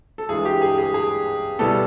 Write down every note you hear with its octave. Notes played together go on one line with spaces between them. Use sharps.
A4
G2 E3 G#3 G#4
G4
G#4
G#4
G#4
B2 G3 B3 E4 A4